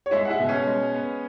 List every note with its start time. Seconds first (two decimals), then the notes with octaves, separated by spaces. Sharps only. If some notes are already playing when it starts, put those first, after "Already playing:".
0.06 C#5
0.11 G#3 E4 E5
0.25 F#5
0.30 E4 E5
0.39 B2
0.49 C#4 C#5
0.67 G#3
0.94 B3